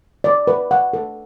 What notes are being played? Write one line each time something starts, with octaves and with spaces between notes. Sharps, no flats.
D5
B4
F#5
A4